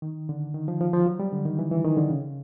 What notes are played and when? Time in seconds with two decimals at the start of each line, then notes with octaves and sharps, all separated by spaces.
0.02 D#3
0.29 D3
0.54 D#3
0.68 F3
0.81 F3
0.93 F3
1.06 F#3
1.20 G3
1.32 D3
1.45 D#3
1.59 E3
1.71 E3
1.85 D#3
1.97 D3
2.10 C#3